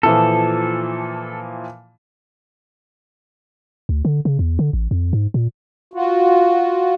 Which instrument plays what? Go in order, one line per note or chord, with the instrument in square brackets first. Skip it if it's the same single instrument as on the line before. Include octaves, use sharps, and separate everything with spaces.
[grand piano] A#2 E3 F3 [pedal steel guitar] A4
[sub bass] D2
D3
C#3
E2
D3
A1
F2
G#2
A#2
[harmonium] F4 F#4